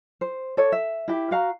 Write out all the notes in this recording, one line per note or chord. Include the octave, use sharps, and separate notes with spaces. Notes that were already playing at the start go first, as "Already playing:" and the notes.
C5
A4 C#5 D5
E5
E4 G4
F#4 F5 A#5